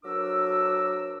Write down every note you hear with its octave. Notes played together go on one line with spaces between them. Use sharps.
D2 F#3 D4 A#4 D6 E6